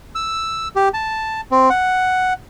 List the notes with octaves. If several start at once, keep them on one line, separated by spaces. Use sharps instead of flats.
E6
G4
A5
C4
F#5